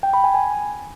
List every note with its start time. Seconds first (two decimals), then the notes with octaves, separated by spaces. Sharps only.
0.03 G5
0.14 B5
0.24 G#5
0.34 G#5